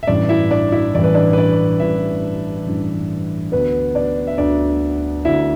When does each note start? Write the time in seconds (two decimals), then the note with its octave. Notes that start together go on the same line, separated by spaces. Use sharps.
0.03 E5
0.07 A1 G2 E3 D4 D5
0.29 E4 E5
0.51 D4 D5
0.72 E4 E5
0.94 A1 G2 E3 D5
1.04 B4
1.15 D4 D5
1.33 B4
1.38 D4 D5
1.80 A1 G2 E3 E4 E5
2.66 A1 G2 E3
3.52 D2 D3 B3 B4
3.95 D4 D5
4.27 E5
4.38 D2 D3 D4 D5
5.25 D2 D3 E4 E5